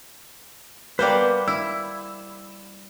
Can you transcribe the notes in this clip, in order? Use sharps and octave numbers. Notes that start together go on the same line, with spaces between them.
G3 A#3 B3 B4 C5
E4 E6